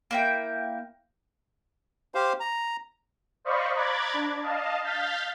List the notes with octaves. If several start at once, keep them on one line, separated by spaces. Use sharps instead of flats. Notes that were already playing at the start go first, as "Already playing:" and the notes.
A#3 E4 G5
G4 C5 F5
A#5
C5 D5 D#5 F5 B5 C#6
A#5 B5 D6 F#6 G#6 A6
D4
D#5 F5 A5
F5 F6 G6 A6 B6